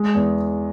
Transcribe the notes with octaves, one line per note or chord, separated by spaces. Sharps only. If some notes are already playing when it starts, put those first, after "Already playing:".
Already playing: G#3
E2